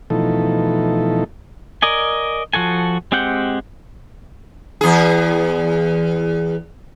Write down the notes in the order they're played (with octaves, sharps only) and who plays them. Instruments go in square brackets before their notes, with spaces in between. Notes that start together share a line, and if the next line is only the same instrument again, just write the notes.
[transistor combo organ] B2 E3 F3 A3 D#4 A4
[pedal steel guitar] A#4 D5 D#5 G#5
F3 F#4 A4 G#5
G#3 C4 G4 F#5 G6
[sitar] E2 G#4